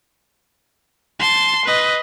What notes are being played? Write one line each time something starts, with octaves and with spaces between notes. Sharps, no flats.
A5 C6
B4 D#5